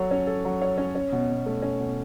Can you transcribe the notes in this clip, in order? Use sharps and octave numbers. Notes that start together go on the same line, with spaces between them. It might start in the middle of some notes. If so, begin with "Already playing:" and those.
Already playing: F#3 A4 C#5
C#4
A4
F#3
C#5
C#4
C#4
B2
B2
A3
C#4
B2